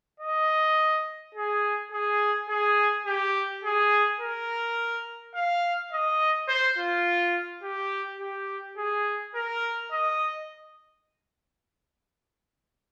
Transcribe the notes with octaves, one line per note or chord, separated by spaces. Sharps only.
D#5
G#4
G#4
G#4
G4
G#4
A#4
F5
D#5
C5
F4
G4
G4
G#4
A#4
D#5